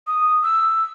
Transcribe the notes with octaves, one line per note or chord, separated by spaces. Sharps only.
D#6
E6